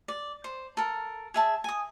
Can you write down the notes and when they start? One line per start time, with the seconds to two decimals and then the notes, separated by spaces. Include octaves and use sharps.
0.08 D5
0.44 C5
0.77 A4 A#4
1.34 G#4 E5 A5
1.64 G#5 D#6